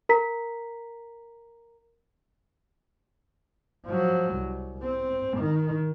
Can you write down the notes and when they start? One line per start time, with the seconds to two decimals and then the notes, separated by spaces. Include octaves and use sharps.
0.09 A#4 A#5 B6
3.86 F3 F#3
4.34 C2
4.83 C4
5.38 D#3